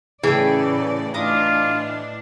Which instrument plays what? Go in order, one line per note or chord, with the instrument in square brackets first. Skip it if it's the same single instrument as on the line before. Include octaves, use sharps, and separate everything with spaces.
[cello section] A2 C#3 D5 [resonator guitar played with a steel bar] E3 [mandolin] G#4 A4 G5
[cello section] A2 D4 [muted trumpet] F4 [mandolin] D#5 D6 D#6